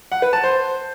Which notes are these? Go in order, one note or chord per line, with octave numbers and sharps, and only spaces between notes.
F#5
B4
A5
C5